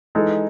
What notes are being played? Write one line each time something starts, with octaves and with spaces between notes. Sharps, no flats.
E3 G#3 D#4 A4